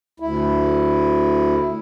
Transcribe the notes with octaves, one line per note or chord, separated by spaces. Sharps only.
D2 E4